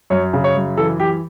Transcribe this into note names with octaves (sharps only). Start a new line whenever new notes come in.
F#2 C#5
C#3
C#5
F#2
E3 A4
E3 G4